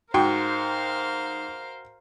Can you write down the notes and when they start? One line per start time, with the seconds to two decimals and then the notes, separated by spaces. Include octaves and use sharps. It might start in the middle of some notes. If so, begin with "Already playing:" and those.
0.14 G#2 F#4 A#4 C5 F5 G5